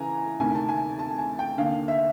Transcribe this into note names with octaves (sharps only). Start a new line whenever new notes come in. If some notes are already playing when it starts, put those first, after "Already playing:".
Already playing: C#3 E3 G#5 A#5
D2 C3 D#3 G#5
A5
G#5
A5
G#5
G5
D#2 D3 F5
E5